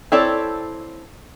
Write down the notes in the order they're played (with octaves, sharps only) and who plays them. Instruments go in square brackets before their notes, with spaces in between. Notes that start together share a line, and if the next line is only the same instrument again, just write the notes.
[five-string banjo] C4 E4 A4 C#5 D5